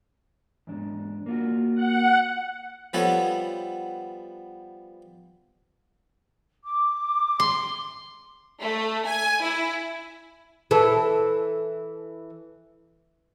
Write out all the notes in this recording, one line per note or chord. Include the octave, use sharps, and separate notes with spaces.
E2 G#2 D4
A#3 F4 F#4
F#5
F3 G3 B3 A4 C#5 F#5
D6
C6
A3
G#5
E4
E3 A4